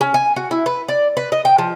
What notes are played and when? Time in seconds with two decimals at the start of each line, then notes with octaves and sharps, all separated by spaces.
0.01 C#4
0.14 G#5
0.36 F#4
0.51 E4
0.66 B4
0.89 D5
1.17 B4
1.32 D#5
1.45 G5
1.58 F3